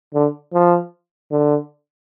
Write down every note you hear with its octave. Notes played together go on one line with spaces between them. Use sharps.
D3
F3
D3